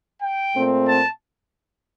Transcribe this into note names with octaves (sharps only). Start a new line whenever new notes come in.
G5
A#2 A3 C4
A5